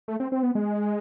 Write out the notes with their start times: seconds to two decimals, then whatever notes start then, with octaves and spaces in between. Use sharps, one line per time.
0.08 A3
0.20 C4
0.32 C4
0.43 B3
0.55 G#3